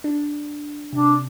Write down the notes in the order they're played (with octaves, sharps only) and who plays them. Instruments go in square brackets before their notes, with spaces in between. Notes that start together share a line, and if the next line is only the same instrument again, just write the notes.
[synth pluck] D4
[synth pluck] C3 [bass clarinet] D4